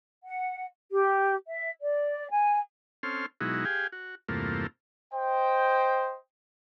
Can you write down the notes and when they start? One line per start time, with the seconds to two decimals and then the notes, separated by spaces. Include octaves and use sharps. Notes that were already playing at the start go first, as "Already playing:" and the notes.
0.23 F#5
0.90 G4
1.46 E5
1.79 D5
2.31 G#5
3.03 C4 C#4 A4 C6 F6
3.41 B2 F#3 G#3 D#4 E4 F#4
3.65 G4 G#4 F5 G5 G#5
3.92 F#4
4.29 E2 G2 C3 A3 A#3 F4
5.13 C5 D#5 G5